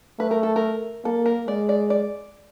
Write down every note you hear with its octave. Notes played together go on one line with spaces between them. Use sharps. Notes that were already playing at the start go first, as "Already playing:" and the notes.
A3 B4
A#4
A4
A#4
A#3 A4
A#4
G#3 D5
D5
D5